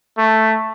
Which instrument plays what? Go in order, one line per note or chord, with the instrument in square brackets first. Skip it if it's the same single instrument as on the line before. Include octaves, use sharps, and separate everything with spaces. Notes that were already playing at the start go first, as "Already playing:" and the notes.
[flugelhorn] A3